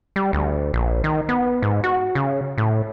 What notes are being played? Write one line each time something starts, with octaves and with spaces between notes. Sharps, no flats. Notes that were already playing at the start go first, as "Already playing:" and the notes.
G3
D2
A#1
D#3
B3
G#2
F#4
C#3
A2